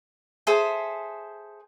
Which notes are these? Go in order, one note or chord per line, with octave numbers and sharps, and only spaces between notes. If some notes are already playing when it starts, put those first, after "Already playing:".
G#4 A4 C5 E5